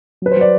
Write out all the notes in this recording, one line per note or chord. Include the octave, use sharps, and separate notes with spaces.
F#3 B4
C5
F#3 D5